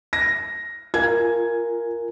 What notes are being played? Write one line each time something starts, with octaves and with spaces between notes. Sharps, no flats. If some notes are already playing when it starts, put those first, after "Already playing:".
A#6
F4 A#4 G#5 G#6